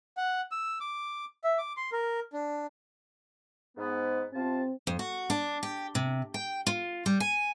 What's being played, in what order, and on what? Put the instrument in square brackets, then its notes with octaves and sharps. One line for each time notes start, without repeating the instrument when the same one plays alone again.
[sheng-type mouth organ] F#5
E6
D6
E5
D6
C6
A#4
D4
[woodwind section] G#2 B3
[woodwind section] C3 F4 A5 [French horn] C4
[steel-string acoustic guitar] F2
F#4
D4
G4
C3
G5
F4
G3
G#5